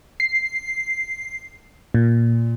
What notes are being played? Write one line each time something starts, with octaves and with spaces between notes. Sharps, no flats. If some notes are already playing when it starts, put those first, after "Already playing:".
C7
A#2